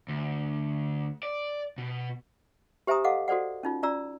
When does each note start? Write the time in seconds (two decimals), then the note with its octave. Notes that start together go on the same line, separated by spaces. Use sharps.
0.08 D2
1.23 D5
1.78 B2
2.87 G4 C5 E5 G#5 A#5 D#6
3.04 A4 D#5 F5 F#5 D6
3.28 F#4 A4 C5 D5 F#5
3.63 C#4 D#4 F4
3.83 C#4 F4 D5 A#5 E6